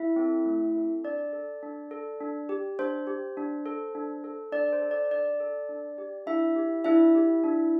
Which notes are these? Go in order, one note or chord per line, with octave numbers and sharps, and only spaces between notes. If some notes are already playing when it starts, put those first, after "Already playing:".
Already playing: E4 E5
C4 A4
A3
C4 A4
D4 D5
A4
D4
A4
D4
G4
D4 C5
G4
D4
A4
D4
A4
D4 D5
C5
A4
D5
D4 D5
A4
D4
G4
D4 E4 E5
G4
D4 E4 E5
G4
D4